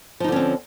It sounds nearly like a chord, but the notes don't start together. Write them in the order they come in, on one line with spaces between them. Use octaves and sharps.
F3 D#4 D3 C#4 C4